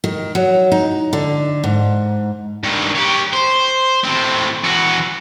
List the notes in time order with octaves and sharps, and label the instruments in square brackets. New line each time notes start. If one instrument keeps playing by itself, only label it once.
[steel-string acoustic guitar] D#3
F#3
D#4
D3
G#2
[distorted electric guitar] G2 D#3
G4 C#5
C5
A2 C4
E3 F#4